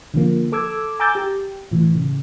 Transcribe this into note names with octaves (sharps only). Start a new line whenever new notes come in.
D3 F3 A#3
A4 D6 E6 G#6
G#5 A#5 D6 E6 G6 A6
G4
A2 E3
C#3